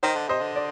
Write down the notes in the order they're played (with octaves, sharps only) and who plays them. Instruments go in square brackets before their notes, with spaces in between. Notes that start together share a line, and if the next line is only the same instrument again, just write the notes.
[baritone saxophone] D#3 [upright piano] C5 D#5
[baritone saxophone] D3
[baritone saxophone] C3 [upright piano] C5 D#5
[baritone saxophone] D3
[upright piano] D5